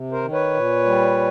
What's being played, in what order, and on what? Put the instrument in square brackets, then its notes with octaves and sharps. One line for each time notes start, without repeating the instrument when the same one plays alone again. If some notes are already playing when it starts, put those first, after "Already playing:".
Already playing: [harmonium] C3
A#4 C5
D#3
B4 C#5
A#2
G3